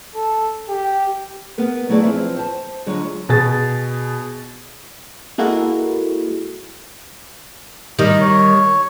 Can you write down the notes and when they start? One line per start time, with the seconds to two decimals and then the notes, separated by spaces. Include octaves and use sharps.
0.16 A4
0.69 G4
1.58 B3 A#4 B4
1.89 F#3 A3 E4 G#4 D5
2.03 F3 C4 B4 E5
2.37 C5 A5
2.86 D3 F#3 G#3 F4
3.29 B2 G#4 A6
5.38 G#3 A#3 E4 F#4 A4
7.99 D#3 G3 D#5
8.21 C#5